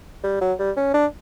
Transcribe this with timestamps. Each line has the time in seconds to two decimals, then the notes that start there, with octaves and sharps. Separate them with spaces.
0.24 G3
0.41 F#3
0.59 G3
0.77 C#4
0.94 D4